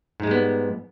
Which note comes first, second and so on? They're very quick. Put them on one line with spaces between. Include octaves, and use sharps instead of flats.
G#2 G#3 G3 B3